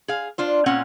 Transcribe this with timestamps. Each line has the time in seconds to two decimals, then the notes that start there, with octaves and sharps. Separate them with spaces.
0.08 G#4 F5
0.38 D4 F4 C5
0.66 A#2 C4 C#4 F4 F#5